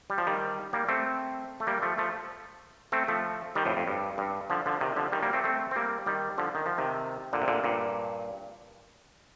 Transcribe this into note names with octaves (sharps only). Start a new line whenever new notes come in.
G3
F3
D#3 G3
G3 A#3
A3 C4
A3
G3 A#3
F3 A3
F3 A3
A3 C4
F3 A3
D#3 G3
F2 A2
F2
G2
G2
D3 F3
D3 F3
C3 D#3
D3 F3
D#3 G3
G3 A#3
A3 C4
A3 C4
C4
G3 A#3
D#3 G3
D3 F3
D#3
F3
C3 D#3
A#2 D3
C3
A#2 D3
G2 A#2